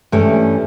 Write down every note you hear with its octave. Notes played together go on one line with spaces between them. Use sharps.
G2 E3 A3 C#4